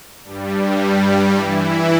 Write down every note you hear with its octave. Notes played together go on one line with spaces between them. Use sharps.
G2 G3
E3 E4